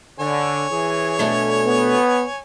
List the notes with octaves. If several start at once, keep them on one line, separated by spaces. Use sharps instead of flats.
D3 C#5 G#5
E3 G#4
B2 A3 D4
B3